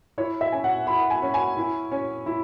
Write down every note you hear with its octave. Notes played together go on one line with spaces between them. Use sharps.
E4 C#5
E5
C#4 G#5
F#5
E4 B5
G#5
C#4
G#5
E4
C#4
E4